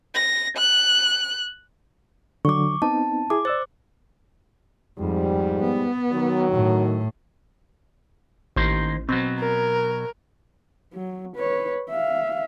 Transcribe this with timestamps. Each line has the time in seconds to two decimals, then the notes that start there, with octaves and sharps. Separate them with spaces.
0.15 A#6
0.57 F#6
2.45 D3 F#3 C#6 D6
2.82 B3 C4 D#4 A5
3.30 E4 G#4 D6
3.45 C5 D5 E6 A6
4.98 F2 G#2 G3
5.60 B3
6.11 D#3 F#3
6.52 A2
8.57 A1 D#3 A#3 C5
9.09 B2 F#3 C4
9.39 A#4
10.94 F#3
11.36 B4 C#5
11.90 E5 F5